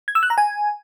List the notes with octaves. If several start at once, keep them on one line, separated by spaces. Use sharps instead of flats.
G#6
E6
F#6
A#5
G#5